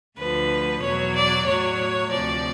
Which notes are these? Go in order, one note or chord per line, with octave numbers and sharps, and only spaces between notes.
D2 D3 F3 B4
E2 B2 F#3 C#5
D5
A2 F#3 C#5
D2 C3 F3 D5